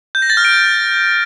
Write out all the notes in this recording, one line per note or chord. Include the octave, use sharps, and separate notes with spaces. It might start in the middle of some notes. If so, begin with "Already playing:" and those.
G6
A#6
A6
F6
D7